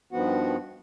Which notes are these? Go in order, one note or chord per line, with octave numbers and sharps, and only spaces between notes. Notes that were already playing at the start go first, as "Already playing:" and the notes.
G2 D#3 F3 B3 F#4 F#5